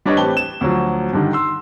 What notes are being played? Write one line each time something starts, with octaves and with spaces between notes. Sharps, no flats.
G3 D4 B4 C#5 D#5
A1 C4 G4 B4 A5 G7
E7
D2 F3 F#3
G2 D3 D#3
C6 E6